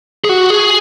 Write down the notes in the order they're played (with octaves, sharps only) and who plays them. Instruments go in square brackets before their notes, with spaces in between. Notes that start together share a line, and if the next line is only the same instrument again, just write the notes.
[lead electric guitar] G#4
F#4
G#4